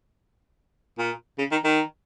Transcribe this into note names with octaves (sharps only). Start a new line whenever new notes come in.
A#2
C#3
D#3
D#3